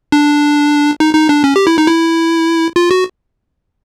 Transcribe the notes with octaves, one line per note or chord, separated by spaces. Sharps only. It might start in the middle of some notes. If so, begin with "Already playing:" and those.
D4
D#4
D#4
D4
C#4
G4
E4
D#4
E4
F4
F#4